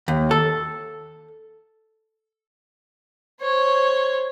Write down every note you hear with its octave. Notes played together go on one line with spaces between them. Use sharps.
D#2
A4
C5 C#5